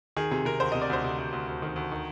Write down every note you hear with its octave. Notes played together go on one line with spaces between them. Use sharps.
D#3 G#4
C3 G#4
C3 A#4
D2 C5
D#5
C3
D5
D2 C5
C3
D2
D2
D2
D#3
D2
D#3